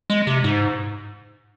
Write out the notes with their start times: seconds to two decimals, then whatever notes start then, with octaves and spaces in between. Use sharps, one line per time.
0.10 G#3
0.27 C3
0.44 G#2